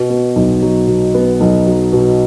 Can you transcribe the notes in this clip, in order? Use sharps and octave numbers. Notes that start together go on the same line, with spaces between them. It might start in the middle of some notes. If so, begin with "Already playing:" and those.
Already playing: B2
B3
B1
F#3
B2
B3
B1
F#3
B2